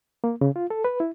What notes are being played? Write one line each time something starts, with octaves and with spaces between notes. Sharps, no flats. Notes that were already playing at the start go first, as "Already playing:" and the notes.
A#3
C#3
F4
A4
B4
E4